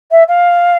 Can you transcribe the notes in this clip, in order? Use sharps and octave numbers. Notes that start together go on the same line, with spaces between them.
E5
F5